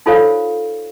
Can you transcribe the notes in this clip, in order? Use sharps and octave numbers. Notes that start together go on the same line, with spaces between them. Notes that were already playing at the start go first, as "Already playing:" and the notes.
D#4 F4 A4 C5 C#5 F5